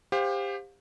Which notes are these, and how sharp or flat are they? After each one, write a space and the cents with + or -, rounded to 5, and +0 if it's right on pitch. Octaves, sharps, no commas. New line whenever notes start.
G4 +25 C5 +0 F5 +35